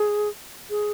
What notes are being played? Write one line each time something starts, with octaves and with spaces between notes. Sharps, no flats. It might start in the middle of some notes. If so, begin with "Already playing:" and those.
Already playing: G#4
G#4